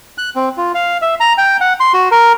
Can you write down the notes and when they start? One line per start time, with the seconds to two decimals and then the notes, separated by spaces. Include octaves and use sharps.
0.18 F#6
0.36 C4
0.57 F4
0.75 F5
1.02 E5
1.20 A#5
1.38 G5
1.61 F#5
1.80 C6
1.94 F#4
2.11 A#4